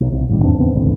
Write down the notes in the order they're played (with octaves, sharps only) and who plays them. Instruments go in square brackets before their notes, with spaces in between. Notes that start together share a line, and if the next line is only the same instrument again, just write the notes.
[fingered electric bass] B1
C2
G1 A2 D#3 G3
E2 G2 C4 D4
E2 C#3 B3 C4
G#1 D2 A#2 E3